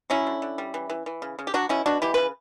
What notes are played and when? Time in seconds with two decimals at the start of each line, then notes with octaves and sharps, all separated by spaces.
0.10 F#3 C#4 E4
0.27 D3
0.42 D3
0.58 G3
0.74 E3
0.89 E3
1.06 E3
1.22 C#3
1.39 C#3
1.47 G4
1.54 F#3 D4 F#4
1.69 B2 C#4 E4
1.86 B2 D4 F#4
2.02 E3 E4 G4
2.14 C#3 B4